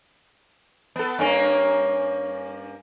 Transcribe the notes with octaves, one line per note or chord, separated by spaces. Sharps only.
B3 A4
G2 A#3 C#4